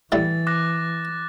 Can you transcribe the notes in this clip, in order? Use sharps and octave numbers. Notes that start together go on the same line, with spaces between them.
A2 E3 G3 E4 A6
D6 F#6 A#6